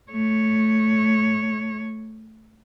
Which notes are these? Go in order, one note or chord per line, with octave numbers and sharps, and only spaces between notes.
A3 C#5